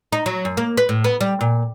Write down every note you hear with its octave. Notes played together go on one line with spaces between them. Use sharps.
D#4
F#3
F#2
A#3
B4
A2
B3
G3
A#2